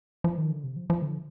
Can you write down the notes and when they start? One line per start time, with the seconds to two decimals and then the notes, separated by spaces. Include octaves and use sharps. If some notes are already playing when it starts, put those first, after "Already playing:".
0.24 F3
0.38 D#3
0.51 D3
0.64 C3
0.76 F3
0.90 F3
1.02 D3